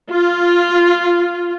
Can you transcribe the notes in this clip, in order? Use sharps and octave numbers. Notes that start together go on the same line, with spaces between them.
F4